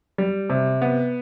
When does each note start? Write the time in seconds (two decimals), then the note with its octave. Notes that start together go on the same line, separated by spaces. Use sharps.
0.18 G3
0.50 C3
0.82 B3